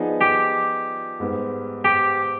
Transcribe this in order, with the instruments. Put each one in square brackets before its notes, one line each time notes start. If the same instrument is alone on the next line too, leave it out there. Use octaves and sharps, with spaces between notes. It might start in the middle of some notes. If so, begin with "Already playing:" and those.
Already playing: [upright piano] F3 B3 D#4 G#4 D5
[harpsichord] G4
[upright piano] G#2 G3 B3
[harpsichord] G4